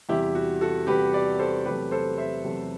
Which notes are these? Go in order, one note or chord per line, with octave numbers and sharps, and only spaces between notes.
E2 C3 G3 E4 G4
F#4
F#4 A4
E2 C3 G3 G4 B4
B4 D5
A4 C5
E2 C3 F#3 A3 G4 B4
A4 C5
C5 E5
E2 C3 F#3 A3